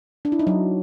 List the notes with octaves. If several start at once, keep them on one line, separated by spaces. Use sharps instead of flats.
D4
E4
D#4
F#3